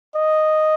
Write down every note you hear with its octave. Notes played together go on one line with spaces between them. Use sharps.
D#5